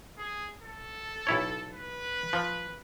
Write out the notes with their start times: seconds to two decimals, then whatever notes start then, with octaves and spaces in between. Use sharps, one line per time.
0.18 G#4
0.63 A4
1.27 B1 E4 C#5
1.73 B4
2.33 F3